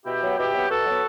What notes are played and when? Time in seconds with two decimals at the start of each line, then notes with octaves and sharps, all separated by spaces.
0.05 B2 E4 G4
0.22 F#3 B3
0.38 B2 E4 G4
0.54 F#3 B3
0.69 B2 F#4 A4
0.86 F#3 B3